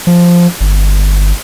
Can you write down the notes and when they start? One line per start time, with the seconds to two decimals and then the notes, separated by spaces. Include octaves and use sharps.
0.07 F3
0.61 G1